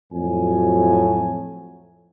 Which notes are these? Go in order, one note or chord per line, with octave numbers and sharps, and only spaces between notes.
F2 A2 F#3 G#5